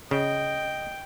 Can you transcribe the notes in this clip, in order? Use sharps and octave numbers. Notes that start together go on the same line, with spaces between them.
C#3 D#5 G5